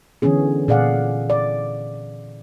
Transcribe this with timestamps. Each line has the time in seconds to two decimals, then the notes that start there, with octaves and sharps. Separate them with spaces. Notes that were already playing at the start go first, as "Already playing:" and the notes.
0.22 D3 E3 B3 C#4 G#4
0.68 A#2 G#4 D5 F5 F#5
1.30 D5